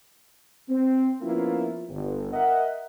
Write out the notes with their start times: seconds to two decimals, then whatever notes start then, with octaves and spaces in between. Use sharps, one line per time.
0.69 C4
1.21 F3 A#3 B3 C#4 E4 F4
1.89 G1
2.33 A#4 D#5 E5 F#5